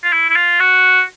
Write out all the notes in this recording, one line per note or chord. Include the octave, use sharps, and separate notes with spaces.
F4
E4
E4
F4
F#4